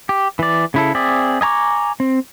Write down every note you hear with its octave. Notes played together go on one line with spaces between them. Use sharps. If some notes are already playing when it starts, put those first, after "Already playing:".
G4
E3 D5
C#3 E4 A4
C4 G#4 D5 E5
D#5 G#5 A#5 C#6 D6
C4